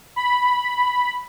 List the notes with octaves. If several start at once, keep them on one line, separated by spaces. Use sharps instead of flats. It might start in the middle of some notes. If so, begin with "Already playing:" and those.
B5